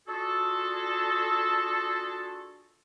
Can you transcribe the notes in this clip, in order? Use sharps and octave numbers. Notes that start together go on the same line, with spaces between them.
D4 F4 F#4 G#4 A4